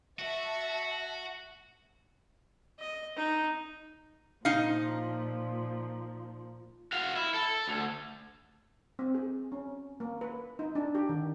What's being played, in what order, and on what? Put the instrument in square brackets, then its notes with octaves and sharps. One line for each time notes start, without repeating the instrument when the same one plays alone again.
[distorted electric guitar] F#4 [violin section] E5 A5
[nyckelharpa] D#5
D#4
[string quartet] A#2 F3 [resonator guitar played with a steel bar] D#4 F5
[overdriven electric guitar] F#4 F5
E4
A4
D2
[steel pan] C4
G#4
C#4
A#3
B4
D#4
D4
G4
D#3